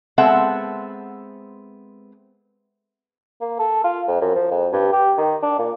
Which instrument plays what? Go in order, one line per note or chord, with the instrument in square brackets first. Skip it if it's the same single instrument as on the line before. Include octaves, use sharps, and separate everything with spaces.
[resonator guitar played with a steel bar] G#3 B3 C4 A4 E5 F#5
[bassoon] A#3
A4
F4
F2
F#2
F3
F2
G2
G4
D#3
D4
A#2